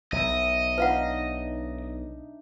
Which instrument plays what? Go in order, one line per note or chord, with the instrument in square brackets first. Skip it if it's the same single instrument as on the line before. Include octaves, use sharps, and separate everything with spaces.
[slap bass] B1 [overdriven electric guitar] D#5 [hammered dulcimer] E5 A#5
[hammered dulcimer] D4 D#4 [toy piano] B4 F5 F#5